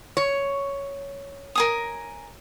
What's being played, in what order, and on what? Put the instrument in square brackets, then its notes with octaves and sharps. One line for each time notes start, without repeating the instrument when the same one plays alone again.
[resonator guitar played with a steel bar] C#5
[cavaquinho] A#4 G#5 D#6